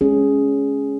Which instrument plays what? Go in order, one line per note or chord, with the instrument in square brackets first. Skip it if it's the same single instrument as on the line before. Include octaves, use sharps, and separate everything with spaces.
[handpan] G#3 C#4 G#4